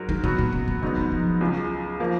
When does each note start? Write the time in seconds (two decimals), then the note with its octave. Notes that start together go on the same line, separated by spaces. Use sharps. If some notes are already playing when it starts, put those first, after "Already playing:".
Already playing: G#2 F#3 F#4 A#4
0.09 D#3
0.23 B2 F#3 B3 F#4
0.39 A#2
0.52 C#3
0.68 B2
0.82 G#2 C#3 F#3 B3 D#4
0.97 D#3
1.12 F3
1.41 C#2 C#3 F#3
2.00 F3 A#3 F4